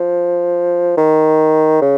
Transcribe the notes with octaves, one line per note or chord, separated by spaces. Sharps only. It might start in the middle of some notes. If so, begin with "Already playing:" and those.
Already playing: F3
D#3
C#3